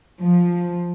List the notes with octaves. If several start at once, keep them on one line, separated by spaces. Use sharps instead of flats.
F3